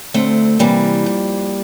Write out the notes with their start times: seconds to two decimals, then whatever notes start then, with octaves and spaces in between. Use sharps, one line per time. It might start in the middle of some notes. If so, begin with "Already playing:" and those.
0.14 D2 A3 C4
0.59 C3 E3 G3 A#3
1.06 F2